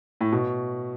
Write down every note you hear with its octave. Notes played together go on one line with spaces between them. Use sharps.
A2
B2